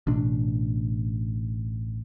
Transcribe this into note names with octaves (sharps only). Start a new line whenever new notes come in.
A1 B2 D4